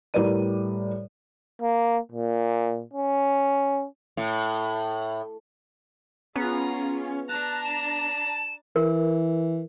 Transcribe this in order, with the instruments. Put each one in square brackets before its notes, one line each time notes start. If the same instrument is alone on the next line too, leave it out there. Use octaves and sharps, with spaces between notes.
[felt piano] A2 G3 A#4 B4 D5 D#7
[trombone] A#3
A#2
C#4
[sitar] A2
[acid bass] B3 [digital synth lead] C#4 [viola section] F4 G#4 [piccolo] A#5
[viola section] D4 A#5 [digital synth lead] A5 [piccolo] F#6
[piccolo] E7
[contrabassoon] E3 [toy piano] A#4